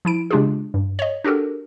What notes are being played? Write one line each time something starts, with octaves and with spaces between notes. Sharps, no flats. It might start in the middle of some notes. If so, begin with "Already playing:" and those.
F3 E4 D7
C#3 G#3 D4 F4 G4 G#4
G2
C#5 D#5
D4 F#4 G4 A4 A#4